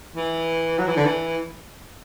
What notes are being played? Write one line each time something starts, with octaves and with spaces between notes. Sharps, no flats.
E3
F#3
E3
D3
E3